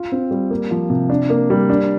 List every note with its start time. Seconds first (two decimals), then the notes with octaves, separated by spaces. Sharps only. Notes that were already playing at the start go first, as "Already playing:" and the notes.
Already playing: F4
0.12 C4
0.31 G3
0.50 A#3
0.71 F3
0.90 C3
1.10 D4
1.30 A#3
1.50 G3
1.70 D4